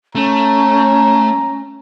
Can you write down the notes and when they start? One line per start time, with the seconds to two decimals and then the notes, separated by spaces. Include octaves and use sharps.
0.15 A3 C#4 A#5